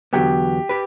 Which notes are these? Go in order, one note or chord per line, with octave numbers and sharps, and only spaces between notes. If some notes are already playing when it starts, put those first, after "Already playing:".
E2 D3 F#3 B3 G4
G4 B4